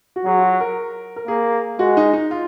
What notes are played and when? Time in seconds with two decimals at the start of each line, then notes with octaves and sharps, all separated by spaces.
0.16 F#4
0.25 F#3 G#4
0.38 F4
0.43 F#4
0.60 A#4
1.16 A#4
1.28 A#3 G#4
1.79 G#3 F#4
1.97 D#4
2.13 D#4
2.31 F4